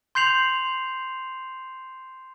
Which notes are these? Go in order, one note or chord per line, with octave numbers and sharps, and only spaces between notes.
C6 G6 C7 F7 F#7